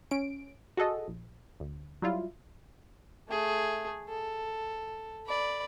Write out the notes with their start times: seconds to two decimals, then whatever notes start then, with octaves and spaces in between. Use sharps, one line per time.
0.11 C#4 D7
0.77 F#4 G#4 A4 D#5
1.08 A#1
1.60 D2
2.02 F#3 G3 E4 F4
3.29 A3 G#4
4.09 A4
5.27 D5 B5